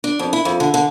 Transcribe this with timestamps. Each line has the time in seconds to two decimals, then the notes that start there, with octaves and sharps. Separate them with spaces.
0.04 D4
0.19 F2
0.33 E4
0.45 F2
0.60 D3
0.74 D3